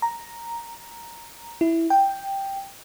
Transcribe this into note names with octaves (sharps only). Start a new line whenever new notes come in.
A#5
E4
G5